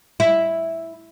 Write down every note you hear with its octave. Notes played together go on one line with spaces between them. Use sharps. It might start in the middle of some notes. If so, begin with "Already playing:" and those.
E4